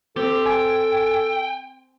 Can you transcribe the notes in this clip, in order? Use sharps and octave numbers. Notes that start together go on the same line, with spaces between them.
C4 G4 A4
G5 G#5